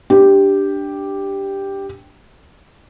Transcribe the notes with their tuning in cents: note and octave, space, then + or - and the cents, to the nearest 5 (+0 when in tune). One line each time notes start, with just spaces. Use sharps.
D4 +0 G4 +0